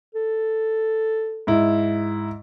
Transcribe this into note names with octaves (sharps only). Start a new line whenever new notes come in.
A4
G#2 E4